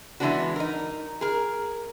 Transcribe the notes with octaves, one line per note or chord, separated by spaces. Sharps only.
E3 F3 G#3 B3 D4 F#4
D#4 A#4
G#4 A#4